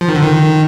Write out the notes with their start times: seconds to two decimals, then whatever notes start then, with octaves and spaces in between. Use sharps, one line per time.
0.01 F3
0.08 D#3
0.15 D3
0.22 D#3